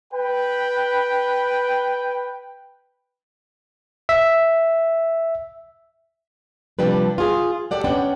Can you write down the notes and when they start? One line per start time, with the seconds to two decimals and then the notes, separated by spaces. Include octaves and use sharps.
0.14 B4 G5
4.09 E5
6.79 C3 F3 G3 D4 B4
7.18 F4 G#4
7.71 G4 A4 D5 F#5
7.84 B3 C#4 D4 F#5 G5